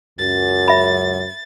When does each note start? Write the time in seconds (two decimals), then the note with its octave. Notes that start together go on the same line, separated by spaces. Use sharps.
0.19 C#2 F#2 A6
0.68 E5 B5